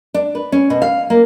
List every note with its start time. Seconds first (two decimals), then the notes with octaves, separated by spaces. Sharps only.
0.14 D4
0.35 B4
0.52 C#4
0.70 B2
0.82 F5
1.10 A#3